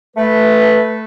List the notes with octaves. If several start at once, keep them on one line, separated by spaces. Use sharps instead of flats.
A3 B4